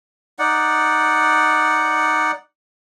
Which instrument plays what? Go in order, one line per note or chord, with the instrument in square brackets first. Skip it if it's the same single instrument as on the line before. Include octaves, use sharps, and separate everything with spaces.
[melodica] D#4 D5 F#5